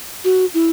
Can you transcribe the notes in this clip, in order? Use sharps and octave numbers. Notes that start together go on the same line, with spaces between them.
F#4
E4